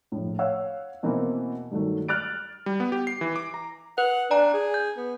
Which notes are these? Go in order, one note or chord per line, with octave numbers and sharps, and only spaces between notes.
A#1 A2
C#5 F5 F#5 E6
B2 E3 A#3 C4 E4
G2 D#3 F#3 A3
F6 F#6 A6 D7
G3
B3
G4
C7
E3
D6
A#5
B4 F#5
D4 D5 G#5 A#5
G#4
G6
B3